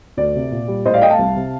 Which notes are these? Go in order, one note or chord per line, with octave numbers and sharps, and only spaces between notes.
D2 D5
C3
A#2
G3
A2 C5 D#5
D5 F5
A3 D#5 G5
F5 A5
C2
C3